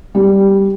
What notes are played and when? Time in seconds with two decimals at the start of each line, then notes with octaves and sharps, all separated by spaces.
0.15 G3